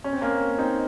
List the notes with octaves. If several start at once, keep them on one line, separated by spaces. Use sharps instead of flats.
C#4
C4
A#3 C#4
C4 D#4